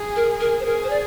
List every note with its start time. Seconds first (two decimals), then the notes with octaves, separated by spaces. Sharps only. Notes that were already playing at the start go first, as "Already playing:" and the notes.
Already playing: G#4
0.16 A#4
0.40 A#4
0.60 C5
0.66 G#4 A#4
0.84 C5
0.90 D5